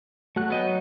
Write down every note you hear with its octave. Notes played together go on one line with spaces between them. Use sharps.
F#3 A3 F#6
B3 D#5 G5
D#4